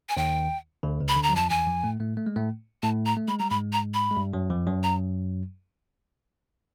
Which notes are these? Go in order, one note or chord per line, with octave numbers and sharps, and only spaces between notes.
G#5
D#2 D#3 G5
D2 D3
C#2 C#3
B5
D2 D3
A#5
F#3
F2 F3 A5
E2 E3 G#5
F2 F3
A2 A3
A2 A3
A3
G#3
A2 A3
A2 A3 A5
A#5
A3
G#3 B5
G3 A#5
G#2 G#3 B5
A#5
B5
G#3
G2 G3
F#2 F#3
F2 F3
F#2 F#3
A#5